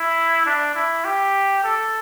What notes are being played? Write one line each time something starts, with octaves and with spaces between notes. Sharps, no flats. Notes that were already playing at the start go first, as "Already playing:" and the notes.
Already playing: E4
D4
E4
G4
A4